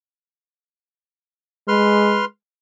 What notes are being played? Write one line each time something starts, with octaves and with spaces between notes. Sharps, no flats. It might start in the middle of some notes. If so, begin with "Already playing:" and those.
G#3 B4 C6 F6